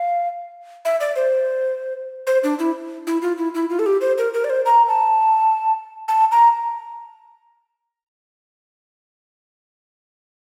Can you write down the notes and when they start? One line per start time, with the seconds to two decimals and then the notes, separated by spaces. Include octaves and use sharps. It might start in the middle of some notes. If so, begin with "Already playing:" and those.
Already playing: F5
0.85 E5
1.01 D5
1.16 C5
2.27 C5
2.44 D4
2.59 E4
3.07 E4
3.22 F4
3.38 E4
3.55 E4
3.70 F4
3.79 A4
3.86 G4
4.01 C5
4.18 A#4
4.34 A#4
4.44 D5
4.50 C5
4.66 A#5
4.88 A5
6.08 A5
6.32 A#5